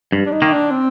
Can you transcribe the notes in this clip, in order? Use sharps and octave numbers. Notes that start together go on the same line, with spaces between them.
G2
D4
D#4
D#3 A#3
D4
C4